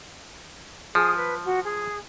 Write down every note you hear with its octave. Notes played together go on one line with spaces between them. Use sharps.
F3 G#4 D#6
B4
F#4
G#4